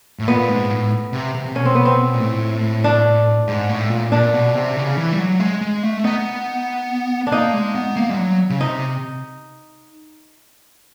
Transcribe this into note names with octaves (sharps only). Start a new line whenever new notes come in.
A2
A#2 B3
G#2
A2
C3
C3
C3
B2 C#4
C4
B3
C4
A#2
A2
D4
G#2
A2
A#2
A#2 D4
B2
C3
C#3
E3
G3
F#3
G#3
G#3
A3
B3 D#4
D4
A#3 D#4
G#3
B3
A#3
G3
F#3
C#3
C3 D#4